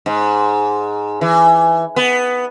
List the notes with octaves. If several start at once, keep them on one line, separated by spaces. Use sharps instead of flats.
G#2
E3
B3